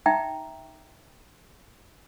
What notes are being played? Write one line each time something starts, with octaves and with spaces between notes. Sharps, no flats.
D#4 E5 G5 A#5